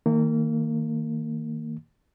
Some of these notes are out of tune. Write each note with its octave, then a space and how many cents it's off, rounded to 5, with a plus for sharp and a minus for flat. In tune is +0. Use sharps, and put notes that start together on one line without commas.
D#3 +20 A#3 -30